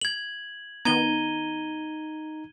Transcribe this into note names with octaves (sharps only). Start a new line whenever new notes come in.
G#6 F#7
D#3 B3 D#4 A#5 G#6 D#7 G7